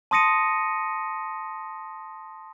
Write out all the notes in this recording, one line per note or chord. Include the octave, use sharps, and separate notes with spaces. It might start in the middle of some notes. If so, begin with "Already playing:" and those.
A5 C6 D#6 A#6 C#7 D#7